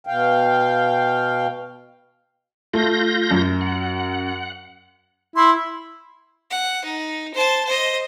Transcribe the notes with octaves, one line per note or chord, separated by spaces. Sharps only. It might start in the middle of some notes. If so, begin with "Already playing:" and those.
B2 F5 G5
A3 F4 G6 A#6
F#2
F#5
E4 C6
F#5
D#4
C5 A5
C5 D#5